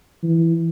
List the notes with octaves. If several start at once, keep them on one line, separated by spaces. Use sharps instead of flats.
E3